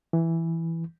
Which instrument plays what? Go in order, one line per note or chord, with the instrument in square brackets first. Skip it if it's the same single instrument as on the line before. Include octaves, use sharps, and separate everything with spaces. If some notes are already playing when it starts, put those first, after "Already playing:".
[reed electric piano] E3